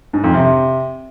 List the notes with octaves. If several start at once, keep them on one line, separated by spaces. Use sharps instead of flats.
G#2
F2
C3